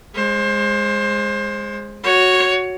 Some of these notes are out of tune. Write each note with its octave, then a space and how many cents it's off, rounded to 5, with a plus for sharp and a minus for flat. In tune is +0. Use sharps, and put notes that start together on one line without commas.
G#3 -10 C5 +25
F#4 +0 C#5 +0